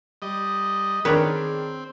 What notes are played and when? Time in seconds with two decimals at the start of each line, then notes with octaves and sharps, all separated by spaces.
0.22 G3 D#5
1.05 D#3 C4 D4 G#4 A#4 B4 C#5